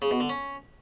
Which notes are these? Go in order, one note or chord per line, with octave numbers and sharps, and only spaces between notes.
C#3
B2
D3
C#4